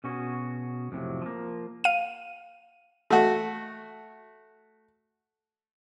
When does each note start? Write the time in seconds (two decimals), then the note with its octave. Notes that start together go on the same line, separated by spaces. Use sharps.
0.04 B2 C#4 F#4 G#4
0.92 F2 A2 C3 F#3
1.22 F3 A#3
1.84 F5 D#7
3.10 A3 F#4